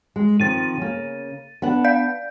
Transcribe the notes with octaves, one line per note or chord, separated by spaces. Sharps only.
G#3
D#3 F3 C4 A6 D#7
C#3 A#3
B3 D4 F#5
D5 F5 G6